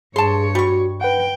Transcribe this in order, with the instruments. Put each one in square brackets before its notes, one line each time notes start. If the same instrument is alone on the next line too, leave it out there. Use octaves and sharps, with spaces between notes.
[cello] G2 C#5 [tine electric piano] G#4 [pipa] A5 C6
[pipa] G3 C#6 [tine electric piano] F#4
[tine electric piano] B4 F#5 [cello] G5